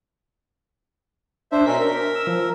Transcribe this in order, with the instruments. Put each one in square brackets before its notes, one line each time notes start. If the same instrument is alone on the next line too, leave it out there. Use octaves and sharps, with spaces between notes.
[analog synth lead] D4 [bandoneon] C5 E5
[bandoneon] B2 C#4 A#4 [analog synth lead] B6
[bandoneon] A#4
[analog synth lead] E6
F3